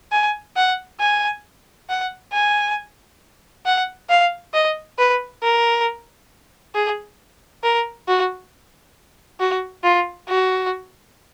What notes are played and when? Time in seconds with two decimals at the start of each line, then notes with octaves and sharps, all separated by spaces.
0.12 G#5
0.56 F#5
1.00 G#5
1.89 F#5
2.33 G#5
3.66 F#5
4.10 F5
4.54 D#5
4.99 B4
5.43 A#4
6.75 G#4
7.63 A#4
8.08 F#4
9.40 F#4
9.84 F4
10.29 F#4